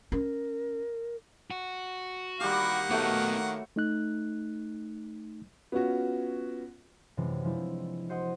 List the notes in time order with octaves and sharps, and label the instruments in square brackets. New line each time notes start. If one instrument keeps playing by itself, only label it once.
[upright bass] C#4 [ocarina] A#4
[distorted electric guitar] F#4
[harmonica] D#3 A#3 F#5 [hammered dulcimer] G3 G4
[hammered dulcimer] A3 F#4 C#5 [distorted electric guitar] B3 D#4
[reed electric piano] A3 D#4 F#6
[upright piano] B3 C#4 F4 F#4
[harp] F#2 C3 E3 G#3
F3 G#3 D4 E4
F#4 C5 D#5 F#5 D#6